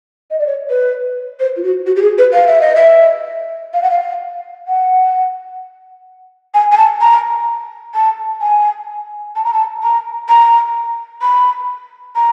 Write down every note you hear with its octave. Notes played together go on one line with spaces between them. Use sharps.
D#5
D5
C#5
B4
C5
F4
F#4
F#4
G4
G#4
B4
F5
E5
D#5
E5
F5
F#5
F5
F#5
G#5
G#5
A5
A#5
A5
G#5
A5
A#5
A5
A#5
A#5
B5
A#5